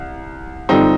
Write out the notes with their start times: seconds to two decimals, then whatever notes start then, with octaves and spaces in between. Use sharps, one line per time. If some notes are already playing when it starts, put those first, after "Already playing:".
Already playing: C2
0.69 G2 D3 F3 C4 D#4